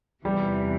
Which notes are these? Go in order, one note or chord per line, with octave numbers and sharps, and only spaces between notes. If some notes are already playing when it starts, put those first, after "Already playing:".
E2 C3 E3 G3 G4